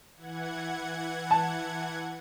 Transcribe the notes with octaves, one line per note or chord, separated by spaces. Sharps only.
E3 F#5 G#6
A5